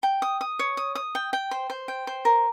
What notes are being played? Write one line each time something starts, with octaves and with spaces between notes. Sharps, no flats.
G5
D#6
D#6
C#5
D#6
D#6
G5
G5
C5
C5
G5
C5
A#4